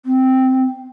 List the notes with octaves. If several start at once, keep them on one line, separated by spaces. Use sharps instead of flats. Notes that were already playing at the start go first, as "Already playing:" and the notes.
C4